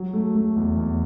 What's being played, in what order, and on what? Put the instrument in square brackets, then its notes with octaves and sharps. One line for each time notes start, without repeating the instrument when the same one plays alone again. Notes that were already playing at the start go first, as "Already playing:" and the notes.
Already playing: [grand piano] F#3
A3
A3
E2
E2